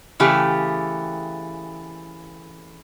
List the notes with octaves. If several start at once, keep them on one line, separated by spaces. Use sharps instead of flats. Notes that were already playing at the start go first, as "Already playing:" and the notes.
C#3 E3 A3 G4